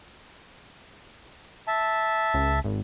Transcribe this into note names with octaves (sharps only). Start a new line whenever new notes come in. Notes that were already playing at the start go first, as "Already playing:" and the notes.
E5 A5
C#2
G#1